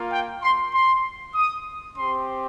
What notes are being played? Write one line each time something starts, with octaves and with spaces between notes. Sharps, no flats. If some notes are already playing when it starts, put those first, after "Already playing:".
Already playing: A#3 F4
G5
C6
C6
D#6
C4 G4 C6